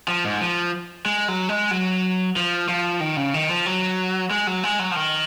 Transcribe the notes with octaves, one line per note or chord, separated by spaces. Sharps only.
F3
G#2
F3
G#3
F#3
G#3
F#3
F3
F3
D#3
C#3
D#3
F3
F#3
G#3
F#3
G#3
F#3
F3
D#3